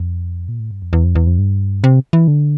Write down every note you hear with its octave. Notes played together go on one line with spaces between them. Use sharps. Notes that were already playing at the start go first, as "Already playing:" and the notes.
Already playing: F2
A#2
A2
G2
F2
E2
F2
E2
F2
G2
C3
E3
D3